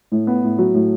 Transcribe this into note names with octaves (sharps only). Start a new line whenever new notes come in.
A2
B3
A2
F#3
A2